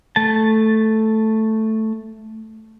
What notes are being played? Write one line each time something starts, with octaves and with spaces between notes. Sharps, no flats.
A3 A5